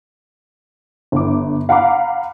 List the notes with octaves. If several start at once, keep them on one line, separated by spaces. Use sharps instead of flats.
G1 D6
F5 F#5 A#5 B5 D6